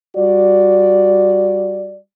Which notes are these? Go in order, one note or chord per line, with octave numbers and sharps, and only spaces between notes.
G3 F#4 D5